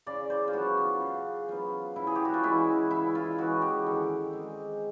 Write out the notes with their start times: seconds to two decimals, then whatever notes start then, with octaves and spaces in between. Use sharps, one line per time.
0.07 C#3 D5
0.30 C5
0.48 F4
0.53 F#3 B3 F#4
0.77 F4
1.01 C#3
1.48 F#3 B3 F4
1.96 C#3 E4
2.07 G#4
2.16 G4
2.25 F#4
2.34 F4
2.43 E3 G#3 E4
2.91 C#3 E4
3.15 F4
3.38 E3 G#3 F#4
3.62 G4
3.86 D#3 A4
4.33 G#3 C4